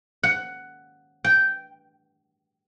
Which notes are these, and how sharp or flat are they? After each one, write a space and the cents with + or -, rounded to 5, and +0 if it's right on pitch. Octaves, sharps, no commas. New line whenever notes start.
F#5 +10
G5 -10